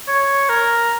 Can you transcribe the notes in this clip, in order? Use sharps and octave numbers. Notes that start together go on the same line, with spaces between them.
C#5
A#4